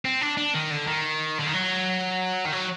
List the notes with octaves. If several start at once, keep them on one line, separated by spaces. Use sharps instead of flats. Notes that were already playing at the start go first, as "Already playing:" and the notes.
C4
D4
D4
D#3
D3
D#3
D3
D#3
F#3
D#3
F#3